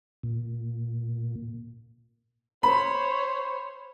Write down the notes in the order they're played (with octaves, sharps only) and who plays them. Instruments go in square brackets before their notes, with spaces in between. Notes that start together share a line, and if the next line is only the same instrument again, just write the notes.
[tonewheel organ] A#2
[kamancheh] C5 C#5 [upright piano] B5